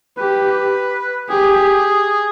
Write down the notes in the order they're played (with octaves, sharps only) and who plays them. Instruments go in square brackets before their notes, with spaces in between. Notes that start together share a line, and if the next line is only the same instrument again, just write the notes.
[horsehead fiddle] G4 [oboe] B4
[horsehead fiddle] G4 [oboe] G#4